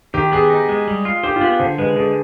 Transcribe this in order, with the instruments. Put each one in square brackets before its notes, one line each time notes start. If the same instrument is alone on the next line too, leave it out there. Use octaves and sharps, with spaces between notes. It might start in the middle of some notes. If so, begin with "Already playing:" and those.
[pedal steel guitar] D#3 [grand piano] G4
[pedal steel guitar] B3 [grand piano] G#4
[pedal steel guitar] D#4
G#3
G3
F4
[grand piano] G4 [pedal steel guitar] C5
[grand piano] F4
[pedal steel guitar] B3
[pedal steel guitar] D3 [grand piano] C5
[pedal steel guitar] G#3 [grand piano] B4
[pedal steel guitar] D3 [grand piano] G#4